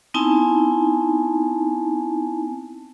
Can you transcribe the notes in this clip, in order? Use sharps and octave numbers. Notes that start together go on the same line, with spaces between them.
B3 C4 D#4 E4 G#5 A5